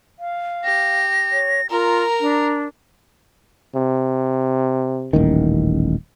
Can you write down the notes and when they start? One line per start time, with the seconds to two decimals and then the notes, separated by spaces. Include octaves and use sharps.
0.19 F5
0.64 G4 A#6
1.32 C#5
1.70 F4 A#4 A#5
2.20 D4
3.75 C3
5.13 D#1 A1 D#3